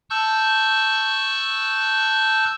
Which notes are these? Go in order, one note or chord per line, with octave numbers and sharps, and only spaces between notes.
A5 C#6 E6 F#6 G6